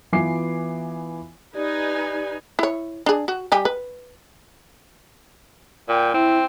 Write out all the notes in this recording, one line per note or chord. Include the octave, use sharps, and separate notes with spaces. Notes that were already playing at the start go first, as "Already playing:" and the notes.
E3 B3 F4 G#5 D6 C7
D#4 G4 B4 D5 G#5
E4 C#5
D4 G#4
F#4
G3 G4 G#5
B4
A#2 G5
C4 E4